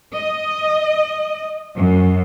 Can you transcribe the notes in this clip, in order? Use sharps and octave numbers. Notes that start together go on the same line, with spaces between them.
D#5
F#2